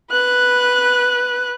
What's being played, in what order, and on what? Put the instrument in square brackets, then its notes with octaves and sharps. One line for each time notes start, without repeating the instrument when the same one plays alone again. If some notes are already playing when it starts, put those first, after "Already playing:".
[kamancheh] B4 F#6